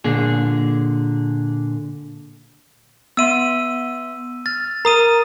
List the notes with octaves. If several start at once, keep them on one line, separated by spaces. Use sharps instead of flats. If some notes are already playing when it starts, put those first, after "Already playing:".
A#2 D3 G#4
B3 E5 C6 E6 D#7
F6 A6
A#4 A#5 D#6 D#7